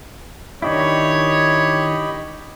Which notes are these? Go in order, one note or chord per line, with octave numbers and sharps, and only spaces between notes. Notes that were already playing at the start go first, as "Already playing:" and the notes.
D#3 D4 E4 G4 C#5 D#5 B5